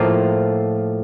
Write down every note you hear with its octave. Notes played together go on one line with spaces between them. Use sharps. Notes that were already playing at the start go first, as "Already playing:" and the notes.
Already playing: A2 F3 A#3 F4